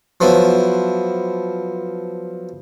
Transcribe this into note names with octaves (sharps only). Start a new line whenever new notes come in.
F3 F#3 B3 E4